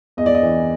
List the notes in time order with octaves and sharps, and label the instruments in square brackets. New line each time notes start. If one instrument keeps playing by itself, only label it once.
[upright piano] E2 D#5
D5
D#5
E3